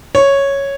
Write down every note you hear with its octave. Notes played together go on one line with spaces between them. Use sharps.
C#5